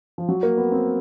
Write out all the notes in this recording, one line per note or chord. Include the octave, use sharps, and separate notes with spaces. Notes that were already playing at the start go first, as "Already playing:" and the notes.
F3
F#3
A#3
B3
C4